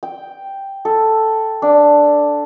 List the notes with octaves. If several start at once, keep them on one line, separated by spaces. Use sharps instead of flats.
G5
A4
D4